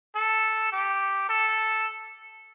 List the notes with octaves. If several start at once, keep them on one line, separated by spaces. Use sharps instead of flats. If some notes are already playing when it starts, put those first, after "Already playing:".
A4
G4
A4